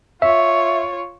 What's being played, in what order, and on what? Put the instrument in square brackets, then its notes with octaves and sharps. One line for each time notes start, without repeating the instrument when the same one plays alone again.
[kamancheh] F4 C#5 [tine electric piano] E5